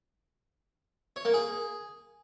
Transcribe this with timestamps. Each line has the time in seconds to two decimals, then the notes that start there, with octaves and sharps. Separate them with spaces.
1.16 C#5
1.25 A#3
1.34 G#4